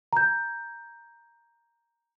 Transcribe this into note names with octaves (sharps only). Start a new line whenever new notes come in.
A#5 G6